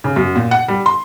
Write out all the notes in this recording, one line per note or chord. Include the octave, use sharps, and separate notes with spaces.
C#3
F#2
A#2
F#5
G3
C6